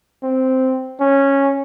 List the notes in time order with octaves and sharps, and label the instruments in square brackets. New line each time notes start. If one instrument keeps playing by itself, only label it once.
[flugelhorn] C4
C#4